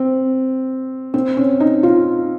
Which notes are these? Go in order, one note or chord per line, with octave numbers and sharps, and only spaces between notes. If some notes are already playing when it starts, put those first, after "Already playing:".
Already playing: C4
C4
C#4
D#4
F4